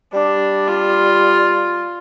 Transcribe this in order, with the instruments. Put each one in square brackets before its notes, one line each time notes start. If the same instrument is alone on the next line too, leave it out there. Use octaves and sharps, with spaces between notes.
[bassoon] G3 [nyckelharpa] D4
[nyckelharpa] F4